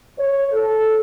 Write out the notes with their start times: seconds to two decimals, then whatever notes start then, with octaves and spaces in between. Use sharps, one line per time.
0.19 C#5
0.52 A4